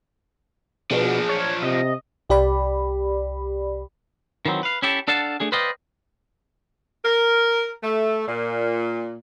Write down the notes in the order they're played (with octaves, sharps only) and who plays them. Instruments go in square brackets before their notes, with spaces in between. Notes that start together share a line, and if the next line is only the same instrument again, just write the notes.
[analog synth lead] B2 [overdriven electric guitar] F3 D4 [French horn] G#4
[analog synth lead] C#5
[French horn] C3 [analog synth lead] D#5
[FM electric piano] C2 G4 D5 B5
[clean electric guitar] D#3 E3 F#3 C4
B4 F5
C#4 E4 G4 A4
D4 A4 D5 F5 F#5 A5
A3 D4 G#4
B4 C5 D5 D#5 F5 G5
[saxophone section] A#4
A3
A#2